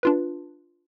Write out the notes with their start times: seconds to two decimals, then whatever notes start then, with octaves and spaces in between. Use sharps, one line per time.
0.03 D4 F4 B4